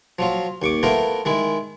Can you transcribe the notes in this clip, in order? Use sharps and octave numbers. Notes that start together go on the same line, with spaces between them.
F3 F#3 F4
D#2 C#6 D6
A3 B3 E4 F4 A#4
D#3 G#3 E4